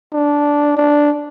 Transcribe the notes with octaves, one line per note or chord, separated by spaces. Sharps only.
D4
D4